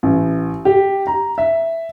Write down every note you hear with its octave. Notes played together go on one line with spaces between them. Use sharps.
A1
G4
A#5
E5